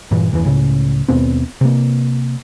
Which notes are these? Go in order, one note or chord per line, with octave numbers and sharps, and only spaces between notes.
G2 A#2 E3
G1 E2 C#3 E3
C#2 A2 C#3
D#2 B2 B3 C4
C3 A#3